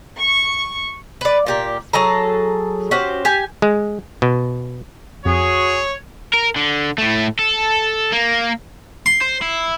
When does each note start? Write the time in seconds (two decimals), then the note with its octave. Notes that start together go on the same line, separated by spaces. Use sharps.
0.18 C#6
1.21 B4 D5
1.47 A#2 G4 A#4
1.93 F#3 G#4 A4 A#5
2.91 C#4 F#4 G4 C5
3.25 G4 G#5
3.62 G#3
4.22 B2
5.25 F2 F#4 G#4 C#5
6.33 A#4
6.56 D3
6.98 A2 A3
7.39 A4
8.12 A#3
9.06 C6
9.21 C5
9.42 E4